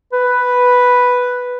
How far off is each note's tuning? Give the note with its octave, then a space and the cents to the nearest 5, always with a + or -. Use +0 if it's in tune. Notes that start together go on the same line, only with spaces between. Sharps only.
B4 +0